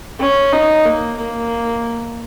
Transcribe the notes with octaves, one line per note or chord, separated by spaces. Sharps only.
C#4
D#4
A#3
A#3